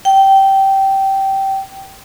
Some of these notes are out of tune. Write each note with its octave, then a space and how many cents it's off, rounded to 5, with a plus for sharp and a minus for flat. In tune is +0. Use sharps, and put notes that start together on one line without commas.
G5 -15